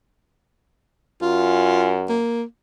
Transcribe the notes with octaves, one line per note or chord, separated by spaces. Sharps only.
F#2 F4
A#3